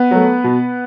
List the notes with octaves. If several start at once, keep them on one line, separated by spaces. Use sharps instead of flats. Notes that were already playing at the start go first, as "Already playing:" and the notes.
Already playing: B3 B4
F#3 A3
B2